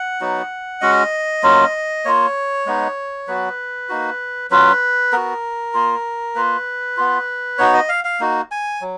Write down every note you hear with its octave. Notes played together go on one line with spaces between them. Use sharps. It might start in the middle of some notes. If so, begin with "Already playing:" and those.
Already playing: F#5
F#3 B3 D#4 F#4
G#3 C#4 F#4 D#5
F#3 A#3 C#4 F4
A#3 F4 C#5
G#3 B3 D#4
F#3 B3 F#4 B4
A#3 D#4 F#4
F#3 C#4 F4 B4
B3 F#4 A#4
A#3 F4
A#3 F4 B4
B3 F4
B3 D#4 F#4 C#5
D#5
F5
F5
A#3 D#4 F#4
G#5
F#3